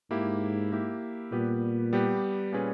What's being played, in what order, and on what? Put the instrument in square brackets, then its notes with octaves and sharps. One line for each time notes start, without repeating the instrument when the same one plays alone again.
[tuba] G#2 [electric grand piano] A#3 E4 G4
[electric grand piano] A#3 E4 G4
[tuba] A#2 [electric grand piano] G3 B3 G4 B4
[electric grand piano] G3 B3 G4 B4
A#2 G3 C#4 G#4 B4